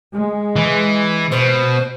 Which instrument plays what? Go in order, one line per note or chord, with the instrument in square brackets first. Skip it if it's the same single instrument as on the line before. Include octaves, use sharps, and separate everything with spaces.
[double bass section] G#3
[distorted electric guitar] E3
[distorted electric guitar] B2 [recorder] C5